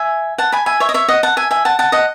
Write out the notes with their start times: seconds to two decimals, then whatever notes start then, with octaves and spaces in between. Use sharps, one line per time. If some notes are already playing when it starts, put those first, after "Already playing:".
Already playing: E5 G#5
0.38 F#5 A5
0.52 G#5 B5
0.66 E5 G#5
0.80 C#5 E5
0.89 D#5
0.94 C#5 E5
1.09 D#5 F#5
1.23 F#5 A5
1.37 E5 G#5
1.51 E5 G#5
1.65 F#5 A5
1.79 F#5 A5
1.92 D#5 F#5